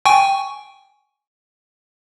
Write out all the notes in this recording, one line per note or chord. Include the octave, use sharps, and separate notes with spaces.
G5 G#5 C#6